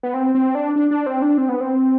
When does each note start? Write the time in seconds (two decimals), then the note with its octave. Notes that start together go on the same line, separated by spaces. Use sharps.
0.03 B3
0.14 C4
0.35 C4
0.55 D4
0.76 D4
0.91 D4
1.06 C4
1.22 D4
1.38 C4
1.49 B3
1.61 C4